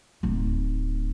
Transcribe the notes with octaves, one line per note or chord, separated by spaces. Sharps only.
D1 D#4